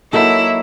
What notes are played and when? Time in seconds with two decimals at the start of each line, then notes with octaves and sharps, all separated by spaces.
0.13 F#3 A#3 D#4 E4 F#4 A4